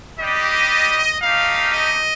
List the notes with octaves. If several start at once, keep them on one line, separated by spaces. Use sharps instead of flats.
G3 D4 G4 D#5
A3 D#4 G4 F5
D#5